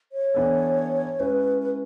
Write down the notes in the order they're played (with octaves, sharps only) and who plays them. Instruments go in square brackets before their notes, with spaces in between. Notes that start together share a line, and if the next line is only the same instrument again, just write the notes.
[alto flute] C#5
[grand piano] E3 B3 D4 A4
[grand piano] G#3 C#4 E4 [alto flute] B4
[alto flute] B4